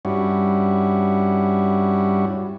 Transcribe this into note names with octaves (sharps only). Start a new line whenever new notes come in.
G2 G3 C#4 E4 F#4